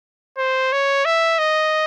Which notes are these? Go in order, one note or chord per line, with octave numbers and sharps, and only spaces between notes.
C5
C#5
E5
D#5